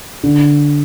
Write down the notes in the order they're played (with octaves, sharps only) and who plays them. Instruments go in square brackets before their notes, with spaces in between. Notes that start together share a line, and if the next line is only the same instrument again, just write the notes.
[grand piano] D3